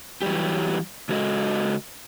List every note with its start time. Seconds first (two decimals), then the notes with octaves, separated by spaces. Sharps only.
0.22 E3 F#3 G3 G4
1.09 C#3 G#3 F#4 A4 D#5